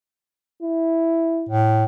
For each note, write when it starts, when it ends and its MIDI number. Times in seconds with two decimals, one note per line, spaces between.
0.63 1.49 64
1.49 1.85 45